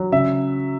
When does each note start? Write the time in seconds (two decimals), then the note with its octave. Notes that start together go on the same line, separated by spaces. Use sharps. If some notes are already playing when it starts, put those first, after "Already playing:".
Already playing: F#3
0.12 C#3 E5